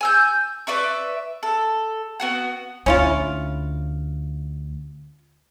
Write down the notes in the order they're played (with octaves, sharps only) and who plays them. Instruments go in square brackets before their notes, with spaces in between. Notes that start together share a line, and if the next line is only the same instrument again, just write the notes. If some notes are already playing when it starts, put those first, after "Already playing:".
[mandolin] G#5 E6 G6
B4 D5 E5 C#6
A4
B3 F#4 F#5
[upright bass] D2 [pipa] C#4 E4 F4